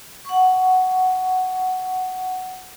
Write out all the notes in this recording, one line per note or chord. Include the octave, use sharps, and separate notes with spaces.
F#5 C#6